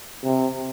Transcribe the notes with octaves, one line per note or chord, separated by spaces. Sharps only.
C3